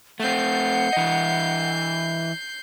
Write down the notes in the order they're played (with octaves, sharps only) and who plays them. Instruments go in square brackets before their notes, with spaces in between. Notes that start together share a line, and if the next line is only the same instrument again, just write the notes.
[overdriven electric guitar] A3 C4 [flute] F#5 [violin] G6 C7
[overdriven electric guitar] E3 D#5